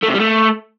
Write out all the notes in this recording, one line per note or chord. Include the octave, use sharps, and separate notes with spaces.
A3
C3
G3
A3